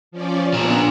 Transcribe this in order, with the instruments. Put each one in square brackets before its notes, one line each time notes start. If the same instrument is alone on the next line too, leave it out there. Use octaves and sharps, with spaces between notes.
[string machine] F3 C#4 D5
[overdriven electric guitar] A#2 D4 [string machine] B3 A#5 F#6